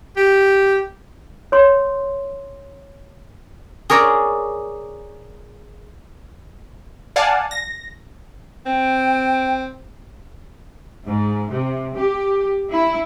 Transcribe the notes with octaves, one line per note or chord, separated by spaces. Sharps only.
G4
C#5 C6
G#4 A#4 C#5 D5
D5 F5 F#5 G#5 A5
A#6
C4 G5
G#2
C3
G4
E4